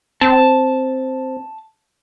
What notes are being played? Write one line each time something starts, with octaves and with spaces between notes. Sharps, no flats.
C4 A5